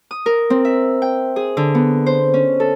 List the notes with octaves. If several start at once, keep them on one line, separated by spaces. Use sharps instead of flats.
D#6
A#4
C4
E5
G5
G#4
D3
B3
C5
C#4
A4